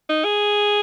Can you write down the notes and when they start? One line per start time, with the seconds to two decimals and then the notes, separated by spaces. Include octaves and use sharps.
0.09 D#4
0.24 G#4